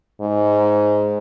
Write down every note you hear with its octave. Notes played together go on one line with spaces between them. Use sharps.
G#2